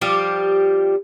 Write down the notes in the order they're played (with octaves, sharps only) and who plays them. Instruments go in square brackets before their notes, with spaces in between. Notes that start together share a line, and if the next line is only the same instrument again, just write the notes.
[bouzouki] F3 G3 G4